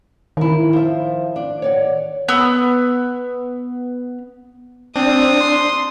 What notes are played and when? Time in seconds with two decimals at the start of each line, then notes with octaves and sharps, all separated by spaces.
0.37 D#3 E4 A#4
0.73 F3 C5 E5
1.36 D4
1.62 C#5 D5 F#5
2.28 B3 E6
4.96 C4 D4 D#6
5.40 C6